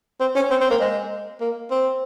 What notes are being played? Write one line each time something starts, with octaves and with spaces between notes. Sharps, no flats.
C4
C#4
C4
C4
A#3
G#3
A#3
C4